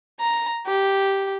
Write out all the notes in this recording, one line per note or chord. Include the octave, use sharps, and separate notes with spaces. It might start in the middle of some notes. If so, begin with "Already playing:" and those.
A#5
G4